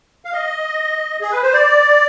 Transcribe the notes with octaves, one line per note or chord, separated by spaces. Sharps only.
F5
D#5
G#4
B4
C5
D5